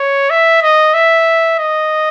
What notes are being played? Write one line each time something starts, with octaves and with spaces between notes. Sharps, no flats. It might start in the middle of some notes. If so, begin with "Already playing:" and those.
Already playing: C#5
E5
D#5
E5
D#5